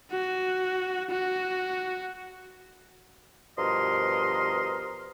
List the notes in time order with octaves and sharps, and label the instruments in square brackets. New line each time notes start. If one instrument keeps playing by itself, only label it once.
[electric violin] F#4
F#4
[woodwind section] G2 B2 F3 A#4 D#5 C6